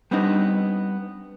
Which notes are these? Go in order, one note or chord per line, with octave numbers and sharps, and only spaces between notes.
G3 B3 C4 D4 D#4